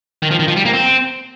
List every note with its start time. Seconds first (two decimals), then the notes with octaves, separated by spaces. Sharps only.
0.22 D#3
0.31 F3
0.39 D#3
0.48 F3
0.56 G3
0.65 A#3
0.73 C4